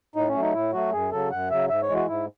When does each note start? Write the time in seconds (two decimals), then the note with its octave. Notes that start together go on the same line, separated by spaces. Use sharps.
0.15 A2 D#4
0.28 C#4
0.35 F#3 A3
0.42 D#4
0.54 A2 E4
0.73 F#3 A3 F#4
0.93 F#2 G#4
1.11 C#3 F#3 A4
1.31 F#2 F#5
1.50 C#3 F#3 E5
1.69 G#2 E5
1.82 C#5
1.89 E3 G#3
1.95 F#4
2.08 G#2 E4